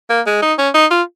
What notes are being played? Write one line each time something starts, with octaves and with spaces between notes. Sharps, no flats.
A#3
G#3
D#4
C#4
D#4
F4